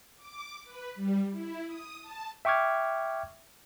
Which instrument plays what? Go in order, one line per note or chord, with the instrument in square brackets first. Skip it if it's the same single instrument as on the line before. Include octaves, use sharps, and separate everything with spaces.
[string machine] D6
B4
G3
E4
D#6
A5
[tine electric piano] E5 G5 C#6 D6 F6 G#6